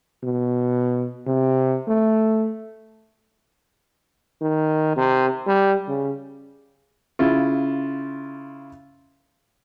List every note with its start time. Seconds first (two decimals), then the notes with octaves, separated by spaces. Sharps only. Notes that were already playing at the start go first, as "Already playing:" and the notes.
0.23 B2
1.26 C3
1.87 A3
4.42 D#3
4.97 C3
5.47 G3
5.88 C#3
7.19 C#3 E4 F4